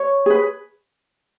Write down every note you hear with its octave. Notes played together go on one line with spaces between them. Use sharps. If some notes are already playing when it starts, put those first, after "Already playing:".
Already playing: C#5
G#4 B4